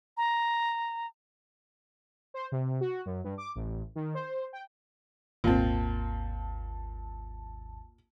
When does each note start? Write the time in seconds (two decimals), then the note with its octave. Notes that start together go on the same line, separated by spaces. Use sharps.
0.17 A#5
2.34 C5
2.52 C3
2.81 F#4
3.06 F#2
3.24 G2
3.38 D6
3.55 A1
3.95 D#3
4.14 C5
4.53 G5
5.44 G#1 D#2 A#2 C4 A5